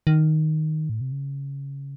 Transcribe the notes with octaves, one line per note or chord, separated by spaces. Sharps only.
D#3
A2
C3
C#3